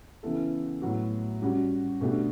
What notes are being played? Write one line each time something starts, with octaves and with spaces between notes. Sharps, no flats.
C#3 E3 B3 E4 A4
A2 F#3 B3 F#4
G3 C#4 F#4
B2 A3 D4 G4